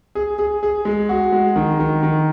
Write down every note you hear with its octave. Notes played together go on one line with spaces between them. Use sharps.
G#4
G#4
G#4
G#3
F#4
G#3
D#3
D#3
D#3